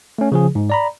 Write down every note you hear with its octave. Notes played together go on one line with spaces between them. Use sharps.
A3 C#4
C#3 F3 G#4
G#2
D5 A#5 B5